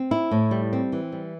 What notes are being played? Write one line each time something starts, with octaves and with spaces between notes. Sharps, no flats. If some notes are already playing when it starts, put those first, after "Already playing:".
Already playing: C4
E4
A2
G3
C4
E3
G3